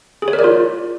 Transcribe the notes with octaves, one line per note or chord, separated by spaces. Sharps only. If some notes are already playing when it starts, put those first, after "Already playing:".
G#4
C#5
A#4
D5
F4